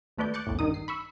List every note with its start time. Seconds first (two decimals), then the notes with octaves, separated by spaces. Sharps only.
0.17 D#2 A3 B4 D5 G6
0.34 D6 F#6 G6 A6 C#7
0.47 A#1 E2 A2
0.59 G2 D#3 D#4 D#6
0.74 C7
0.88 B5 C#6 E6